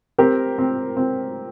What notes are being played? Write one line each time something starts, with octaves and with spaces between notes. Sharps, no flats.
C4 G4 A#4
C4
C4